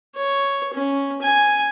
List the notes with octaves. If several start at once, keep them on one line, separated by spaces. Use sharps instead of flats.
C#5
C#4
G#5